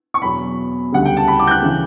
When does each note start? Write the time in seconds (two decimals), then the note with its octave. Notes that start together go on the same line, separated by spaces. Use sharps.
0.14 C#6
0.22 E2 B2 F#3 B5
0.92 D2 C#3 G3 F#5
1.05 G5
1.17 A5
1.28 B5
1.39 D6
1.47 G6
1.51 F#6
1.63 C#3 E3